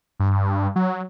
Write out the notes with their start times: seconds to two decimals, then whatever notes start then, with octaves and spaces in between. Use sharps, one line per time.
0.20 G2
0.76 F#3